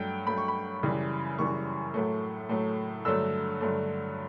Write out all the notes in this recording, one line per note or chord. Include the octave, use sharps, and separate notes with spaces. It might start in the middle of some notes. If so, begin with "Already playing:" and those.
Already playing: G2 F#3 A3 G5
G2 F#3 A3 B5
C#6
B5
F#2 C#3 E3 G3
F#2 C#3 E3 G3 C#6
A2 F#3 A3
A2 F#3 A3
G2 D3 F#3 A3 E6
G2 D3 F#3 A3